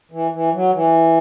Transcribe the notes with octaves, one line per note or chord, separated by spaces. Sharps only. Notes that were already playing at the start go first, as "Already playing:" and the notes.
E3
E3
F#3
E3